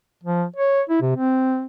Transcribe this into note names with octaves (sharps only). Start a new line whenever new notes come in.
F3
C#5
E4
C3
C4